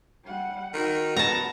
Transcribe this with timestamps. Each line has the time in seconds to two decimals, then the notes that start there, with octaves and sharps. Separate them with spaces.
0.24 G3 F#5
0.74 D#3 F#4
1.16 B3 A5 A#5